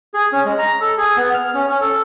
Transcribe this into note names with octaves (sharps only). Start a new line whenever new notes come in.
G#4
C#4
G#3
A#5
A4
G#4
B3
F6
C#4
C#4
A4